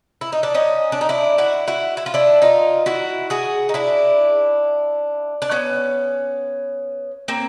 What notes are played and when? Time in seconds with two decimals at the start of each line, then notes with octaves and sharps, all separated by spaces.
0.21 E4
0.32 D#4
0.43 D4
0.54 C#4 D#4
0.92 D4
1.01 D#4
1.09 D4 E4
1.38 E4 F#4
1.68 E4 F#4
1.97 E4
2.06 F4
2.14 D4 E4
2.42 D#4 F4
2.86 E4 F#4
3.30 F#4 G#4
3.69 D#4
3.74 D4 E4
5.42 D4
5.51 B3 C#4
7.28 A#3 C4